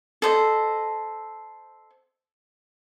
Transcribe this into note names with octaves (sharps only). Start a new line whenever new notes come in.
A4 C5 D#5